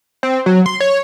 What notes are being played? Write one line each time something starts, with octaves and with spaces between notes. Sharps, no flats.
C4
F#3
C6
C#5